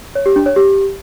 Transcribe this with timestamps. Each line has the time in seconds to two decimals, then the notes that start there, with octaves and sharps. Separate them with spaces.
0.15 C#5
0.26 G4
0.36 D4
0.46 C#5
0.56 G4